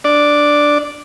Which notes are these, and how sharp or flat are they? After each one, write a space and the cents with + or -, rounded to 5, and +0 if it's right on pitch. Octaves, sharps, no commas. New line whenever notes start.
D4 +0 D5 +0